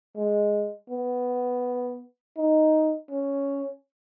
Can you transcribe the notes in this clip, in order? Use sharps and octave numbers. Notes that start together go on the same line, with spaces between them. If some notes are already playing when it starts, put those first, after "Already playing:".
G#3
B3
D#4
C#4